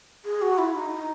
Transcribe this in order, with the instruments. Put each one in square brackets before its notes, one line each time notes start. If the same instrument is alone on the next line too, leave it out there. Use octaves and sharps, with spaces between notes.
[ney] G#4
F#4
E4
D#4
D#4